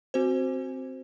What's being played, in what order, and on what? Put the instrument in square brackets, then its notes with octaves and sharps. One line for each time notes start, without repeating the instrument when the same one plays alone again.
[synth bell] C4 F#4 C5